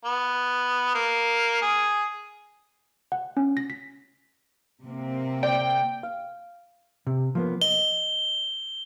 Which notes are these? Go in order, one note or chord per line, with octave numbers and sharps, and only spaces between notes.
B3
A#3
G#4
F#5
C#4
A#6
B6
C3 A#3 C4
D5 G5
F5
C3
F3 A#3 B3
D#5 G7